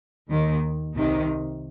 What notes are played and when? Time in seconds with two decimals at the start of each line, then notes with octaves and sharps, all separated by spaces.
0.29 D#2 D#3
0.96 C2 C3 D#3